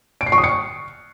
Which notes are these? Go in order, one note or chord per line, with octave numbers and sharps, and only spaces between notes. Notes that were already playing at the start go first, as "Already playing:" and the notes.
D7
C7
C#6
D#6
C#7